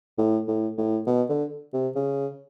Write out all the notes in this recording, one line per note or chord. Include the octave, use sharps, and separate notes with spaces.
A2
A2
A2
B2
D3
C3
C#3